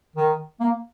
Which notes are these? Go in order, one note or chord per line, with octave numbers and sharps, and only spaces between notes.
D#3
A#3